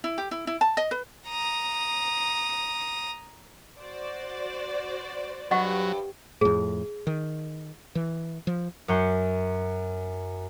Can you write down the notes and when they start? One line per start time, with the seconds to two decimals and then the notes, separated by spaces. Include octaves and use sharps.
0.04 E4
0.18 G4
0.31 E4
0.47 E4
0.61 A5
0.77 D#5
0.91 B4
1.27 A#5 D#6
3.79 F#4 C5 D5
5.51 G2 F#3 D#5 F#5 C#6
6.41 F2 A2 G#4
7.07 D#3
7.95 E3
8.47 F3
8.88 F#2 F#5 C#6 G6 C7